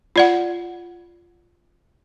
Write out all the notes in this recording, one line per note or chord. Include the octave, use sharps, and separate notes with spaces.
F4 D5 F#5